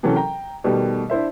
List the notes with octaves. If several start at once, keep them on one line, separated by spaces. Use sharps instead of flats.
C3 E3 F#3 C#4 A4 A#4
G5 A#5
B2 D#3 G3 A3 G4
D4 E4 C5 E5